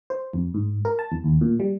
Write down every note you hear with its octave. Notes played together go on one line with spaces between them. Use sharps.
C5
F2
G#2
A#4
A5
E2
D#2
A#2
G3